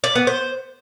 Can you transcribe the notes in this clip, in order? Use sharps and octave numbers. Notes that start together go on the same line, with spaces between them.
D5
B3
C5